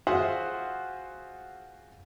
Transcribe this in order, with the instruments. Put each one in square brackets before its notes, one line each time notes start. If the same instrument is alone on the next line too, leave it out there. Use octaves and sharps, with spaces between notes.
[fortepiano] F4 F#4 G#4 C5 E5 F#5